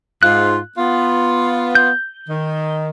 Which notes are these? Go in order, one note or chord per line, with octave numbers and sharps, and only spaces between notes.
G#2 F4 F#6
B3 F4
G6
D#3